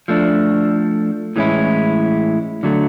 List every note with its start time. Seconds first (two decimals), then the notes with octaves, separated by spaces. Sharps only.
0.08 F3 A3 D4
1.36 A2 E3 G#3 C#4 E4
2.63 D3 F#3 A3